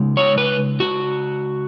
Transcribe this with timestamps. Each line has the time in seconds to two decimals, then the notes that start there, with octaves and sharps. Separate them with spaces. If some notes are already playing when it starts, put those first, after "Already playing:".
Already playing: C#3 G#3 D#4
0.17 C#5
0.38 B4
0.80 F#4